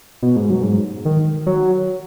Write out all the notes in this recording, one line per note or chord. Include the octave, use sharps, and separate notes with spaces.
B2
G#2
F#2
G#2
D#3
F#3